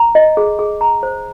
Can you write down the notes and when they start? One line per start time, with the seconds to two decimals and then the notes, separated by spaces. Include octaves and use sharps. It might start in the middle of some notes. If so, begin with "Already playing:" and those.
Already playing: A#5
0.15 D#5
0.37 G#4
0.59 G#4
0.81 A#5
1.03 C5